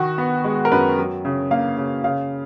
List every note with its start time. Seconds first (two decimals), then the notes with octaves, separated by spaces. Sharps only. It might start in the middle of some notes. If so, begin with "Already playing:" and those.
Already playing: D#3 F#4
0.18 B3
0.44 G#3
0.65 A#4
0.72 F#2 B4
0.97 F#3
1.25 C#3
1.51 A#3 F5
1.77 C#3
2.04 C#3 F5